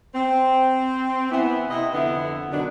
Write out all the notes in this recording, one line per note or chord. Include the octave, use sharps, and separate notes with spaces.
C4
E3 B3
C3 E4 D#5
F2 D3 B3 E4
B2 D3 D#3 F#3 B3 D4